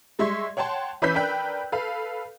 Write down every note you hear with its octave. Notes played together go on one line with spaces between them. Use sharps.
G3 G#3 E5 C6 C#6 G#6
C#5 F#5 G5 A5 C6
E3 C#4 B4 E6 G6 B6
D4 A#4 B4 G5 F#6
A4 B4 F5